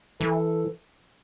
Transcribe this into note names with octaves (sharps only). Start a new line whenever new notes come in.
E3 A4